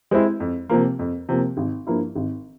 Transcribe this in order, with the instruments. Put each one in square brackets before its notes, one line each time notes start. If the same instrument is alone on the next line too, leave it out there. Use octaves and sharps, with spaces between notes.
[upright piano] G#3 C4 E4
F2
C3 F3 A#3
F2
C3 F3 A#3
G#1
G2 F3 A#3 E4
G#1